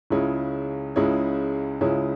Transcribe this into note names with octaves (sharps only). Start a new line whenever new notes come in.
C#2 C#3 G#3 E4 C#5
C#2 C#3 G#3 E4 C#5
C#2 C#3 G#3 E4 C#5